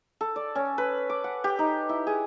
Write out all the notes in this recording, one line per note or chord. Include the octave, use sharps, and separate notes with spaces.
A4
D5
C#4
B4
D6
F#5
G4
D#4
E4
G#4